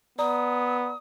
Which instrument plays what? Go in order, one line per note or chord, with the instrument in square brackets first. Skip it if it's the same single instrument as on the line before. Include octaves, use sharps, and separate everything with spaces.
[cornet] B3 [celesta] D5 A#5 [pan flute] D#6